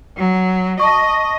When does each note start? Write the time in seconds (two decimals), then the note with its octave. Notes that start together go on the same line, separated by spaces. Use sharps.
0.17 F#3
0.79 D#5 A5 C#6